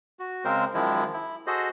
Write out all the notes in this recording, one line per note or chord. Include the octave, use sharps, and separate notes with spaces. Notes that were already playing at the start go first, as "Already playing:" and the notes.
F#4
C#3 G#3 C4 A#4 C5
F#2 D#3 F3 G#3 E4
E4
F#4 G#4 A4 C5 D#5